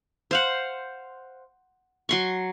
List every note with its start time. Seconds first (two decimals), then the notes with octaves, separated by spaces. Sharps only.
0.31 C5 F5 F#5
2.09 F#3 C6 C#6